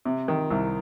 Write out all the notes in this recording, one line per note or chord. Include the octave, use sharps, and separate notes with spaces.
C3
D#3
C2